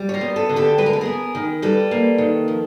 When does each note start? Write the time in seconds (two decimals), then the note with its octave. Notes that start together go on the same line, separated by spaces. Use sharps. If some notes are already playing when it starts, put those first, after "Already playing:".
Already playing: G3
0.09 C#5
0.14 A#4 C5
0.21 B3
0.36 A4 B4
0.49 D3
0.56 G4 A4
0.78 G#3 B4
0.86 A#4
0.93 A4
1.01 B3 G#4 A#4
1.35 D#3
1.62 G3 A4 B4
1.91 A#3
2.18 D#3
2.48 F3